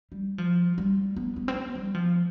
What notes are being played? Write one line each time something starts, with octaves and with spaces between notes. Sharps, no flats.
G3
F3
G3
B3
B3
C4
B3
G3
F3